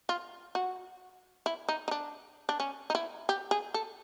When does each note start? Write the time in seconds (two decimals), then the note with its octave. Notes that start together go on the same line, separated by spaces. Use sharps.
0.09 F4
0.55 F#4
1.46 E4
1.69 D#4
1.88 D#4
1.91 D4
2.49 D4
2.60 C#4
2.90 D#4
2.95 E4
3.29 G4
3.51 G#4
3.74 A4